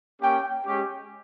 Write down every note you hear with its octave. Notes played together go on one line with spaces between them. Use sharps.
A#3 C#4 G4 G5
G#3 C#4 G4